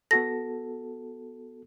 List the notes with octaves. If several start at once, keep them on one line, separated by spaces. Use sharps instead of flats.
B3 F#4 A4 A#6